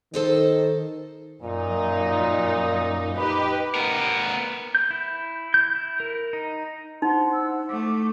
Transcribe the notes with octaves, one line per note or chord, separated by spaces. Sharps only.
D#3 A4 C5 D#5
F#2 A#2 D#4
D#4 G4 B4
B3 A#4
G6
E4
G6
E4
A#4
D#4
D#4 E4 C5 F#5 C6
E6
A3 D6